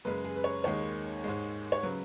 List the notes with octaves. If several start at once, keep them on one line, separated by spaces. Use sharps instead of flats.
F#2 C#3 G#3 B4
G#4
B4
C#5
D#2 D#3 G#3 C#5
G#2 G#3
C#5
C#3 F#3 B4